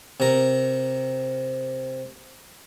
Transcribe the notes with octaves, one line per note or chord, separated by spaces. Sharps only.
C3 A#4